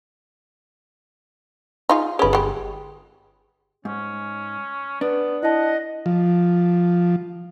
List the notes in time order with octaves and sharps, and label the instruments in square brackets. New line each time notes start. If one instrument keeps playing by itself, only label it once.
[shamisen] D#4 F4 G#4
[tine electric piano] G1 G#4 [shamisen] C#4 B4
[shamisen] G#3 G4
[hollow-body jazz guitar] G#2 [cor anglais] C#4
[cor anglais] B3 [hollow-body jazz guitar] D4 [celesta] B4
[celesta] E4 A5 [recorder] D#5 [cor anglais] F#5
[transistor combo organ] F3